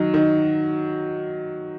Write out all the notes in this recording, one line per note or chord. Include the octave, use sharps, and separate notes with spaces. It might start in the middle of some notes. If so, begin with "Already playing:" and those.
Already playing: D#3 F#3
D#3